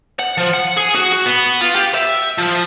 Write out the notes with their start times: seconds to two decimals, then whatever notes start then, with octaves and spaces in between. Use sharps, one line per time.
0.19 F#5
0.38 F3
0.54 F#5
0.77 G#4
0.95 F#4
1.12 F#4
1.26 B3
1.61 F4
1.75 G4
1.94 E5
2.38 F3